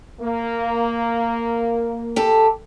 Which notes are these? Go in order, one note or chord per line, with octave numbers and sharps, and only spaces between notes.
A#3
G4 A4